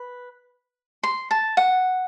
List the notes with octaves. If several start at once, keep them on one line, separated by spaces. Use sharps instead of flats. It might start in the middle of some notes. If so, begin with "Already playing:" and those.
Already playing: B4
C6
A5
F#5